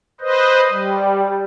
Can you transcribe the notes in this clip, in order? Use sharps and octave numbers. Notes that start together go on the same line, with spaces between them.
B4 C5 D#5
G3